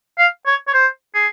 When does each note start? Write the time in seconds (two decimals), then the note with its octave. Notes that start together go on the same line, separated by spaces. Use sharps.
0.18 F5
0.46 C#5
0.67 C#5
0.74 C5
1.14 G#4